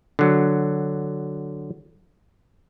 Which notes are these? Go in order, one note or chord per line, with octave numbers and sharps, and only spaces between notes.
D3 F#3